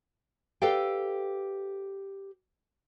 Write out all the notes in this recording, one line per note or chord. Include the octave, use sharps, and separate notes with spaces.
G4 A4 B4 D5 F5 G5